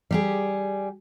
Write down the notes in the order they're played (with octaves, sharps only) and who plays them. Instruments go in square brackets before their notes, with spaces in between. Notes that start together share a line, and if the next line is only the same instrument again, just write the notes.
[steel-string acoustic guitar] G3 G4 G#4